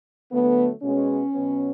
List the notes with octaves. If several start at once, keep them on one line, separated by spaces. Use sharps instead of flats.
D3 F#3 A3 B3
B2 G#3 B3 C#4
B2 F#3 B3